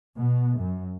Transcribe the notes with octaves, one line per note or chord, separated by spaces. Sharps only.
B2
F#2